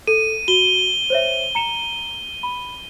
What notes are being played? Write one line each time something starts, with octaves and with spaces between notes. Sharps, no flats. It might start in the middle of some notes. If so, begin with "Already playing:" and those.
A4 D#7
F#4 G7
C5 C#5 E5
A#5 C#7 E7
B5